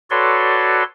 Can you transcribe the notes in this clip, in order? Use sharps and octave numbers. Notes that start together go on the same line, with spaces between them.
F#4 A4 B4 C#5 D5 C6